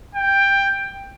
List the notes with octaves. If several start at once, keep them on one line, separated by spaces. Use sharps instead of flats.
G5